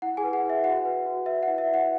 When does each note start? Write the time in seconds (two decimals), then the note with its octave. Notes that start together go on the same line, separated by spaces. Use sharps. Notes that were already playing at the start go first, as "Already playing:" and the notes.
0.02 E4 F#5
0.17 G#4 G#5
0.24 B4
0.33 F#5
0.43 E4
0.50 E5
0.64 F#4 F#5
0.85 B4
1.06 F#4
1.26 B4 E5
1.43 F#5
1.47 E4
1.58 E5
1.69 E4
1.74 F#5